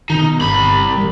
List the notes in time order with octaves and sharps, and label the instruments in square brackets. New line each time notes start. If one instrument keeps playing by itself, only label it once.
[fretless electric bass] B2 D#3 [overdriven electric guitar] D#4
[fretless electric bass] G1 [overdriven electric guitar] C2 B5
[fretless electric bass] A1 G3